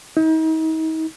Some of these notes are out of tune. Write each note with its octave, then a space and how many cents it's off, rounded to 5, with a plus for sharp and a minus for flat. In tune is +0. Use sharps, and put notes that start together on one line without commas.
D#4 +40